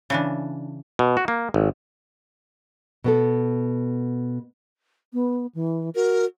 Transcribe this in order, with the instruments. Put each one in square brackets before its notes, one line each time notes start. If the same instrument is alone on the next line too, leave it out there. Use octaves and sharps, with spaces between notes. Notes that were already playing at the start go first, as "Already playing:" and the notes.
[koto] C#3 E3 D4
[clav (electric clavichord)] B2
F#4
A#3
G#1
[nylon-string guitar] B2 B3 A4
[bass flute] B3
E3
[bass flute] F#4 [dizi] A#4